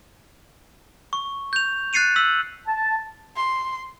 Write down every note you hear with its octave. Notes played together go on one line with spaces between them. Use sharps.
C#6
G6 F7
F#6 A6 C7 C#7 D#7 F7
E6 B6 F#7
A5
C6